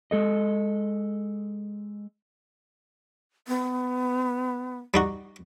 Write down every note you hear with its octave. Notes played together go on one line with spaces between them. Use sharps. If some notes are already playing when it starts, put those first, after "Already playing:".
G#3 A4 D#5
B3
G3 D#4 F#4